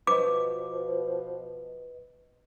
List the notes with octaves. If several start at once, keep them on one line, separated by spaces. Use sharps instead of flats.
B2 F3 B4 D#5 D6